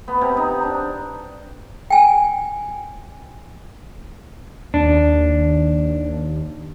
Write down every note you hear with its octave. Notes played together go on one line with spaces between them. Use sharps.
B3
C3
D#4
D4
G5 G#5
D#2 D4